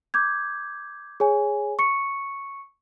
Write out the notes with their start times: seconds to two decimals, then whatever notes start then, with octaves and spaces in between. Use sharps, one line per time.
0.14 D6 G6 G#6
1.20 G#4 C#5 G#5
1.79 C#6 C#7